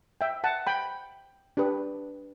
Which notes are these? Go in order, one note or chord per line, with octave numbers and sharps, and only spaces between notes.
E5 G5
F#5 A5
G5 B5
D4 G4 B4